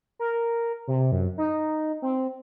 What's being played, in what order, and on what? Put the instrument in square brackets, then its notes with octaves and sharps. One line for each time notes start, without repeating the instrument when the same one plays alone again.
[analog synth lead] A#4
C3
F#2
D#4
C4